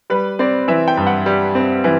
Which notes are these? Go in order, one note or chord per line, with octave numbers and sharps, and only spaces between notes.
G3 B4
C4 D5
E3 E5
G5
G2
F#5
G3
C4
E3